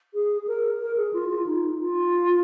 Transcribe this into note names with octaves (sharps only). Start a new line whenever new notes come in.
G#4
A#4
A#4
G#4
F4
F4
D#4
F4